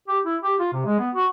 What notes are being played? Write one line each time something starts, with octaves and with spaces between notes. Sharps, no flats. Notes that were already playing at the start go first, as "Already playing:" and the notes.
G4
E4
G4
F4
C3
G#3
B3
F#4